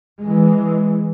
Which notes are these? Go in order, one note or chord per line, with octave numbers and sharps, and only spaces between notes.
E3 G#3